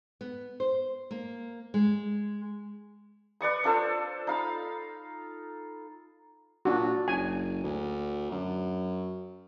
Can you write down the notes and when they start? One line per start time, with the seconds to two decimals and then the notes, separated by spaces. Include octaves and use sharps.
0.21 B3
0.60 C5
1.11 A#3
1.74 G#3
3.41 B4 D5 C#6 D#6
3.64 D4 F4 A4 C5
4.27 D#4 F5 B5
6.65 A#2 D4 F#4
7.08 F#1 G#5
7.63 D2
8.31 F#2